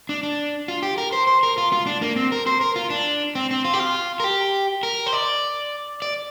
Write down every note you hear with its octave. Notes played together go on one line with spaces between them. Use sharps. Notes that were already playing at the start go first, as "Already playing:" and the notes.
D4
D4
F4
G4
A#4
C5
C5
A#4
F4
F4
D4
A#3
C4
A#4
C5
A#4
F4
D4
C4
C4
F4
G4
F4
A#4
G4
A#4
C5
D5
D5